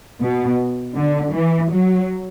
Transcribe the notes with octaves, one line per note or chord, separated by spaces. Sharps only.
B2
D3
E3
F#3